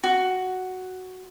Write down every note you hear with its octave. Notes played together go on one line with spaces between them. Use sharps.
F#4